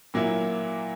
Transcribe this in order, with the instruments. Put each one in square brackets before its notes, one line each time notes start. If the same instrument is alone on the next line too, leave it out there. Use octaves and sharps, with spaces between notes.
[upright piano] A#2 F#3 A#3 E4